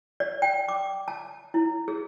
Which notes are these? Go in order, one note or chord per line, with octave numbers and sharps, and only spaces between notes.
D5
G5
D6
A5
E4
G#4